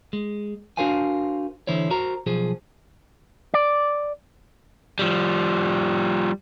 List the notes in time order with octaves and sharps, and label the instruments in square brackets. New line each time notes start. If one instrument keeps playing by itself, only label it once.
[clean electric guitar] G#3
D4 F#4 A#4 C5 F5 G#5
D3 E3 E4 C5 C#5
F#4 A#4 C5 A#5
B1 F3 G#4 C5
D5
[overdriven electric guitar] F3 G3